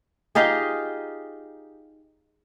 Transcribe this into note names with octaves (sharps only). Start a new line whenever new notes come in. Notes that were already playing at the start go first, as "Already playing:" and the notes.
D#4 F4 G4 G#4